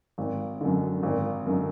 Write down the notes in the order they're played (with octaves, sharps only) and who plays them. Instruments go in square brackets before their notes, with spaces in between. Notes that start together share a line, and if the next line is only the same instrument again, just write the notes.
[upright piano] G#1
F#2 D3
G#1
F#2 D3